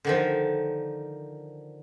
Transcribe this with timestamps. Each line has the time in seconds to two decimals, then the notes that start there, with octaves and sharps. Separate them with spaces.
0.05 D3 D#3 F3